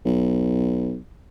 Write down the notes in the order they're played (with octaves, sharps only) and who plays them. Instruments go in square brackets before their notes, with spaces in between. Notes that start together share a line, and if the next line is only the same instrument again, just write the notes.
[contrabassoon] B1